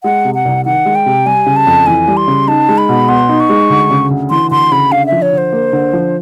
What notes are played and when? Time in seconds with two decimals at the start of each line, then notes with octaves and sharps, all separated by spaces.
0.04 G#3 F#5
0.25 C3
0.35 F#5
0.45 C2
0.65 D#3 F#5
0.86 G#3
0.95 G5
1.06 C3
1.26 G3 G#5
1.46 C#3
1.56 A5
1.67 F2
1.86 E3 G#5
2.08 G3
2.17 C6
2.28 C#3
2.48 D#4 A5
2.69 G#3
2.78 B5
2.89 B2
3.09 B3 C6
3.29 D#4
3.40 C#6
3.49 G#3
3.70 D2
3.91 C#3
4.11 D2
4.30 E3 C6
4.51 D2 C6
4.72 C#3 B5
4.92 D3 F5
5.06 E5
5.12 F3
5.22 C#5
5.33 D3 C5
5.52 A#3
5.73 D3
5.93 F3